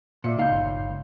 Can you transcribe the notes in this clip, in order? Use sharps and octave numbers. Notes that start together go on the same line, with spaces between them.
A#2 D5 E5 C#7
C#2 D#4 F5 G6
G1